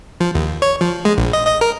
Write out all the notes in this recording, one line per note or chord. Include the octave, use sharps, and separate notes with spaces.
F3
D#2
C#5
F3
G#3
A#1
D#5
D#5
A#4